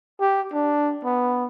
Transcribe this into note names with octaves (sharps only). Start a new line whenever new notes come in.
G4
D4
B3